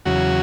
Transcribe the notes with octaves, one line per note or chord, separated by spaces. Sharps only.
E2 C#3 F#3 F#4